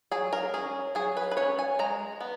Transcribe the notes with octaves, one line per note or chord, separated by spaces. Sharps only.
F#3 G#4
A#4
C#4 G#4
F#3 G#4
B4
B4
C#4 C#5
G#5
G#3 A#5
B3